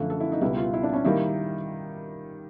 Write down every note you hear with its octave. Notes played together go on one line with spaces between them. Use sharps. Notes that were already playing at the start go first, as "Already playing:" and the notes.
Already playing: F#2 D3 F3 A3
A4
E4
D#4
C#2 B2 G3 E4
F4
E4
D4
C#4
D#3 G3 A#3 E4